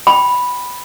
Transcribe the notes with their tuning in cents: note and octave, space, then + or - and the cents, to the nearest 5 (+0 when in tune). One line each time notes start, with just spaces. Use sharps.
G5 +0 B5 +0